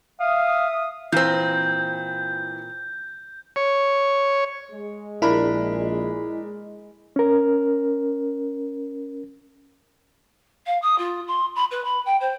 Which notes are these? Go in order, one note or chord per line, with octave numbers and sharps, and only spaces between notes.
E5 F5 D#6
A#2 E3 C4 G6
C#5
G#3
A#1 D4 E4 A#4 B5
C#4 A#4
F5
D#6
F4
C6
B5
B4
B5
G5
C5